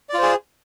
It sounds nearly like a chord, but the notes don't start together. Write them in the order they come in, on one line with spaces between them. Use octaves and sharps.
D5 F4 C5 G#4